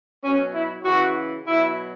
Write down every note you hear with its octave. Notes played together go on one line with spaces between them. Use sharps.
B2 F#3 C#4
E4
C#3 E3 F#4
B2 F#3 E4